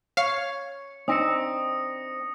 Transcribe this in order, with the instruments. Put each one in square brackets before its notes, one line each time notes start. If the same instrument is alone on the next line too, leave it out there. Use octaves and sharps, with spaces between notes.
[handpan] C#5 [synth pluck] F5 [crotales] C#7
[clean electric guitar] C4 [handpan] D4 D#4 [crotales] D#6 A#6 C#7